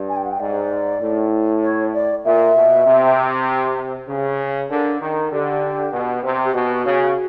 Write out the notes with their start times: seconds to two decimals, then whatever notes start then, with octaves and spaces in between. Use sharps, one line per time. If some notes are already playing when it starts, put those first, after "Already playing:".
Already playing: G2
0.08 G#5
0.16 G5
0.23 F#5
0.30 G5
0.39 G#2 D5
1.01 A2
1.62 C#5
1.93 D5
2.23 A#2 E5
2.54 B2
2.85 C3
4.07 C#3
4.69 D3 A#4
5.00 D#3
5.31 D3 G4
5.92 B2
6.23 C3
6.44 G4
6.53 B2 F#4
6.84 C#3